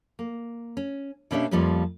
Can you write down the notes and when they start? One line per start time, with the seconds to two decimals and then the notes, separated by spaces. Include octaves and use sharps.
0.19 A#3
0.77 C#4
1.31 B2 A#3 C#4 D4 G4 E5
1.51 F2 F3 G3 A#3 C#4